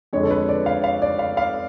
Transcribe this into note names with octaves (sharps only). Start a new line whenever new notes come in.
F2 D3 G#3 C#5
A4
B4
D5
F5
F5
D5
F5
F5